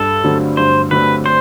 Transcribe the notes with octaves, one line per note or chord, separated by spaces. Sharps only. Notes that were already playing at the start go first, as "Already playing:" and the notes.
Already playing: G2 A4
D3 F#3 A3 C4
G2 C5
D3 F#3 A3 C4 B4
C5